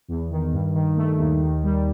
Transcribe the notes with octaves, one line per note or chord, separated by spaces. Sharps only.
E2
D#3
G2
D#3
A3
D#2
D#3
G3